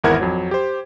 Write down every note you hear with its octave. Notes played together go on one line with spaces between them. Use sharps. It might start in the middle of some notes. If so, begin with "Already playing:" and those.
G#1 E2 E4 A#4 F#5 G#6
F2 F#3
G4 C5